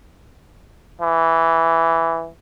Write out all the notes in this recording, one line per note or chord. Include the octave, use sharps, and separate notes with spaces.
E3